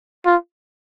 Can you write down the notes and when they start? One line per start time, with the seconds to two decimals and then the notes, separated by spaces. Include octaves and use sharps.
0.26 F4